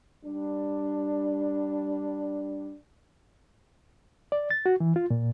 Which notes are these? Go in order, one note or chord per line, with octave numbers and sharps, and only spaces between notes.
G3 D4
D5
A6
F#4
E3
F4
A#2